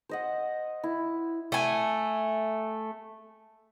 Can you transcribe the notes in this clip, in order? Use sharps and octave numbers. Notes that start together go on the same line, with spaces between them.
C5 D#5 F#5
E4
A3 G#5